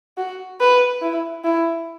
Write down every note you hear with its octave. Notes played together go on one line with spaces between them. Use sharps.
F#4
B4
E4
E4